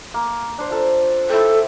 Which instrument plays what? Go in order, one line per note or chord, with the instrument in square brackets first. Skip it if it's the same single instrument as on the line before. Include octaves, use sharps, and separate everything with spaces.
[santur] A#3
D4 C5
F4 A4 C5
[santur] E4 G5 [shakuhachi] A4